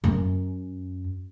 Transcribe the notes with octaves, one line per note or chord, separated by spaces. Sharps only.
F#2 C#4